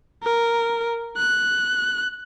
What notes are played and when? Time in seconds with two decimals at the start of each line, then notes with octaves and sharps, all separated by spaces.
0.23 A#4
1.18 F#6